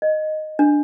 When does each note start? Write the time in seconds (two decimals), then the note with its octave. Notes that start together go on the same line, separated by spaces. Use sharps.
0.02 D#5
0.59 D4